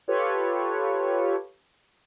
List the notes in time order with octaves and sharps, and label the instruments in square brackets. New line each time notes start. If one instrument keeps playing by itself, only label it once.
[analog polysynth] F4 G4 A4 B4 C#5